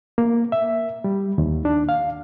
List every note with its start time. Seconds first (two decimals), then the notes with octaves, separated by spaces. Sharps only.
0.18 A#3
0.52 E5
1.04 G3
1.38 D#2
1.65 D4
1.89 F5